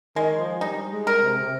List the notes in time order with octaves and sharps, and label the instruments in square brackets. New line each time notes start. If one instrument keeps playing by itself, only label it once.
[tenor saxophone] D#3 [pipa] G#3
[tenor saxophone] F3
[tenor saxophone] G3 [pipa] D#4
[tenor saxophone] G#3
[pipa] A#4
[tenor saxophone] C3
C3